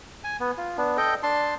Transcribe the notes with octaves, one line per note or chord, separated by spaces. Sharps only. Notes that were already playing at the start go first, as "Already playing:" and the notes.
G#5
B3
F4
B3 D4
A4 D#5 G5
D4 A5 C6